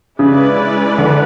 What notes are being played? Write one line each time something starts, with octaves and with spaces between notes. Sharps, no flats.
C#3 G#3 C#4 E4 B4 D5
D3